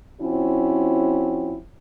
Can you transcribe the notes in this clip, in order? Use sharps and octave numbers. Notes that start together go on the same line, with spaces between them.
F3 C4 C#4 E4 F#4